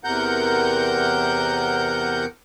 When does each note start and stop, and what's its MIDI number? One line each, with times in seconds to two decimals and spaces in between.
0.04 2.26 40
0.04 2.26 48
0.04 2.26 70
0.04 2.26 78
0.04 2.26 91